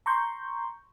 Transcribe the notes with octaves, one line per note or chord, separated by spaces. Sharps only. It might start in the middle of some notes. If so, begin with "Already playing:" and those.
A#5 C6 C#6 G6